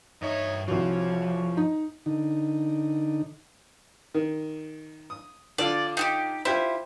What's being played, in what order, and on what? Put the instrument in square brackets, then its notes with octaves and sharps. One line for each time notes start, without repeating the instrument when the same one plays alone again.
[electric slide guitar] G2 E5 [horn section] D#4 C#5
[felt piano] C2 F#4 [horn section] C#3 C#5 [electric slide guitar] F3
[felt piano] D#4
[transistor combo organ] D3 D#4
[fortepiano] D#3
D#6
[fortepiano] D3 F4 [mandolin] D5
[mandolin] D#4 F#4 G4
[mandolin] E4 [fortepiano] F4 G4 C5